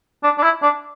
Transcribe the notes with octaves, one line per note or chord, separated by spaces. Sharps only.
D4
D4
E4
D4